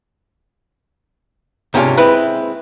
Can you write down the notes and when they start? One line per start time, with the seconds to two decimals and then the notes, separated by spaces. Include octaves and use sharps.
1.74 G#2 C3 A#3 C#4 D4 F4
1.98 G#3 C4 E4 B4